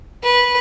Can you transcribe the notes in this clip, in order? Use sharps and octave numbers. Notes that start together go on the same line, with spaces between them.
B4